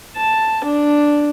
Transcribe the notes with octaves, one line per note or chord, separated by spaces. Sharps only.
A5
D4